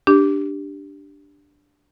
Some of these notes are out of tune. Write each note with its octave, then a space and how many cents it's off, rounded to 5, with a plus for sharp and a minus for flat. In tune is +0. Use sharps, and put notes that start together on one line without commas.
D4 +0 G4 +0